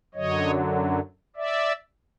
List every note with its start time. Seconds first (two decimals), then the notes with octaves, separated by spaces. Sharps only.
0.14 F#2 D3 F#3 C#5 D#5
1.36 D5 E5